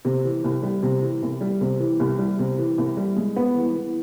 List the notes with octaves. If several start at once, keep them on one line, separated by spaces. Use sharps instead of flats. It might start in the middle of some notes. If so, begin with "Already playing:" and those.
C3
E3
C2
G3
C3
E3
C2
G3
C3
E3
C2
G3
C3
E3
C2
G3
G#3
B3
E3
E3